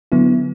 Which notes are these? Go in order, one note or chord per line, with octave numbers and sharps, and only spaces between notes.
D3 F#3 B3 E4